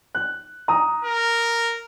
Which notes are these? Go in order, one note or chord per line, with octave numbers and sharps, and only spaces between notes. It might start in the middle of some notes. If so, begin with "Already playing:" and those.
F#6
A#5 D#6
A#4